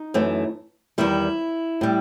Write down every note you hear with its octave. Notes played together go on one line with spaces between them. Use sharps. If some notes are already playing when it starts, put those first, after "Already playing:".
Already playing: D#4
F#2 E3 A3
E2 D#3 G3 E4
A2 G3